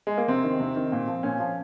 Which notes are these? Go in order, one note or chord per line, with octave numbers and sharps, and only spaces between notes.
G#3
A#3
C3 C4
D#3
C3
D#3
A#2
F3
A#2 C#4
F3